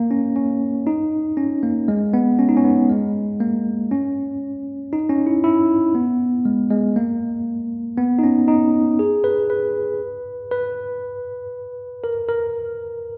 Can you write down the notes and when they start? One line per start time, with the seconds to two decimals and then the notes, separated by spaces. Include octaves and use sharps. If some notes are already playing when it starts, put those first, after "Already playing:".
Already playing: A#3
0.11 C#4
0.36 C#4
0.87 D#4
1.37 C#4
1.63 A#3
1.88 G#3
2.13 B3
2.39 C#4
2.49 D#4
2.57 C#4
2.64 B3
2.89 G#3
3.40 A#3
3.91 C#4
4.93 D#4
5.09 C#4
5.27 E4
5.44 E4
5.95 B3
6.45 G#3
6.71 G#3
6.96 A#3
7.97 B3
8.19 D#4
8.23 C#4
8.48 D#4
8.99 G#4
9.24 B4
9.50 B4
10.51 B4
12.04 A#4
12.28 A#4